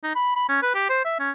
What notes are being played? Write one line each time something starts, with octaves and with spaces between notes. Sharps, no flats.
D#4
B5
B5
C#4
B4
G4
C5
E5
C#4